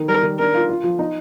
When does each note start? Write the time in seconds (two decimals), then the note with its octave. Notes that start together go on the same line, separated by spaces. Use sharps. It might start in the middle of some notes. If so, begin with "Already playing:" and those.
Already playing: D#3
0.09 G3 A#4
0.23 D#3
0.39 D4 A#4
0.54 F4
0.69 F4
0.84 F3
0.99 D#4